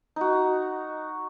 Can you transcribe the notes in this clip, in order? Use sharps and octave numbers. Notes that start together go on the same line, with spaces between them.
D#4 F#4